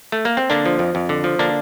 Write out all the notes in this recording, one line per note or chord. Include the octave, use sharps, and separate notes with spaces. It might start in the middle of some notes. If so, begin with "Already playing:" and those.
A3
A#3
C4
D3 A#3 D4
F3
F2
F2
D3
F3
D3 A#3 D4